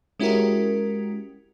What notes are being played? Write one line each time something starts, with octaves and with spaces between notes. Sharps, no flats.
G#3 C#4 E4 F#4 G4 A#4